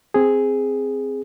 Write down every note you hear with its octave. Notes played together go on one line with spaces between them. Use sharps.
C4 G#4